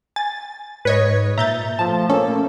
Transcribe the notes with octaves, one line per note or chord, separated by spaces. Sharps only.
G#5 A6
G#2 B4 C#5 D#5
A#2 E5 A#5 G6 A6
F3 A3 A5
A#3 C#4 A4